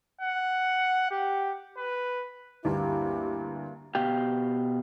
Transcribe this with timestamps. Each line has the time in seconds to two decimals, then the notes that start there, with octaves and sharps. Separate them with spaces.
0.21 F#5
1.11 G4
1.77 B4
2.65 D2 G2 A#3 E4 G4
3.95 B2 G4 F5 G5